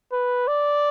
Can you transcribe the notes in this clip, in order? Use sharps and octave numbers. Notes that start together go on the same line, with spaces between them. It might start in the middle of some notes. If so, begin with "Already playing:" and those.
B4
D5